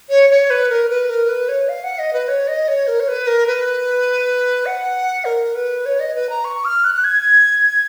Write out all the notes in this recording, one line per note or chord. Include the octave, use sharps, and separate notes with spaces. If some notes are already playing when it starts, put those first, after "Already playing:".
C#5
C#5
B4
A#4
B4
A#4
B4
C#5
F5
F#5
D#5
B4
C#5
D#5
C#5
A#4
C#5
B4
A#4
B4
F#5
A#4
B4
C#5
D#5
B4
A#5
C#6
F6
F#6
F#6
G#6